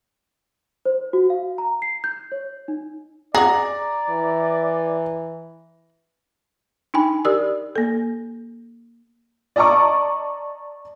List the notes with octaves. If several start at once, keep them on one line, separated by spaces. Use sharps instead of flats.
C5
F#4
F5
A#5
C7
G6
C#5
D#4
G#4 D5 F#5 A#5
E3
D4 D#4 G5 G#5 B5
G4 A#4 D5 D#6 E6
A#3 A4
D5 D#5 A5 A#5 C#6 D6